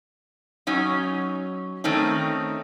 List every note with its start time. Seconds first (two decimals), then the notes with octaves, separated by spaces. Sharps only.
0.67 F#3 C#4 D#4
1.84 D#3 A3 C4 C#4 D#4